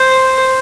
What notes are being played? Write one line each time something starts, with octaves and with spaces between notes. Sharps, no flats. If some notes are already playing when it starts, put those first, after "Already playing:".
Already playing: C5